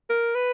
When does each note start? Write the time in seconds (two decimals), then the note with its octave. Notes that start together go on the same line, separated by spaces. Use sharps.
0.10 A#4
0.35 B4